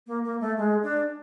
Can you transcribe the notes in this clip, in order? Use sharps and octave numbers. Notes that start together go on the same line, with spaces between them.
A#3
A#3
A3
G#3
D4